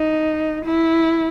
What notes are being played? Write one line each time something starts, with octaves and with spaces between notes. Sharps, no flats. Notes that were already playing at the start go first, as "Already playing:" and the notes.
Already playing: D#4
E4